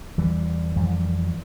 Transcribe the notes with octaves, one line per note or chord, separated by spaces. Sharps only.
E2 E3 G3
F2 E3 G3